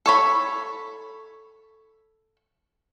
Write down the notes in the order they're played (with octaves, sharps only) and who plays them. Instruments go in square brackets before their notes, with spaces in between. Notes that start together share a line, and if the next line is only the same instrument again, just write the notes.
[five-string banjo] A4 C#5 B5